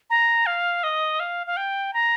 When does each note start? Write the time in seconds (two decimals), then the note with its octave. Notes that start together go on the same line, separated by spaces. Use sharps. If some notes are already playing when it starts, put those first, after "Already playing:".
0.10 A#5
0.46 F5
0.84 D#5
1.20 F5
1.47 F5
1.57 G5
1.94 A#5